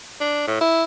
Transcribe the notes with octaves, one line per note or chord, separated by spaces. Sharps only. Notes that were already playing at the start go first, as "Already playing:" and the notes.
D4
A2
E4